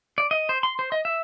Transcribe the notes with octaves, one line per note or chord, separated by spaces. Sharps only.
D5
D#5
C5
C6
C5
D#5
E5